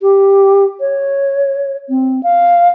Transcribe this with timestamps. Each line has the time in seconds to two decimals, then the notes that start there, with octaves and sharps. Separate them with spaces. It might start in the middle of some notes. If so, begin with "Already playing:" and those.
0.02 G4
0.80 C#5
1.89 C4
2.23 F5